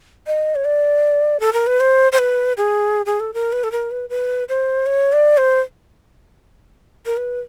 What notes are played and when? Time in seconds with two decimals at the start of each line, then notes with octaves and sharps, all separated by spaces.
0.27 D#5
0.55 C#5
0.65 D5
1.40 A4
1.53 A#4
1.67 B4
1.80 C5
2.12 C5
2.19 B4
2.57 G#4
3.06 G#4
3.20 A4
3.34 A#4
3.53 B4
3.64 A4
3.72 A#4
3.91 B4
4.10 B4
4.49 C5
4.86 C#5
5.13 D5
5.37 C5
7.06 A#4
7.17 B4